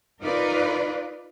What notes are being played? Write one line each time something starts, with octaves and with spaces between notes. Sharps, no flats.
D#4 F4 A#4 B4 D5